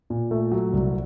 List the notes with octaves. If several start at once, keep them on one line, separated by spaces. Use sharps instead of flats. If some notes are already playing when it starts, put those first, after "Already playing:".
A#2
A3
F#3
C2